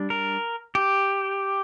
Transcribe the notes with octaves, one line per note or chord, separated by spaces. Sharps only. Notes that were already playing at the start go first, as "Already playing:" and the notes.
Already playing: G3 D4
A#4
G4